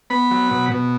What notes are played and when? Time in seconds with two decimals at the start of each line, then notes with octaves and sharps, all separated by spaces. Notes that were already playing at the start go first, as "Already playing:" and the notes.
0.10 B3 B5
0.31 F#3
0.51 B2
0.72 B2